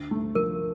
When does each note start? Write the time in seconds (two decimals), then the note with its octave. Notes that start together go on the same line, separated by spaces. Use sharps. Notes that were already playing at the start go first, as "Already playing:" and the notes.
Already playing: D2
0.11 A3
0.35 F3 A#4